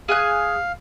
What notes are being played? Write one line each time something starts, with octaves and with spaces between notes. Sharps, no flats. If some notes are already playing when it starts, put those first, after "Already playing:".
G#4 F5 G#5 F#6